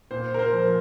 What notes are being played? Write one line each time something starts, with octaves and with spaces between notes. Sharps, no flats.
A#2 C5
A#4
C5
F3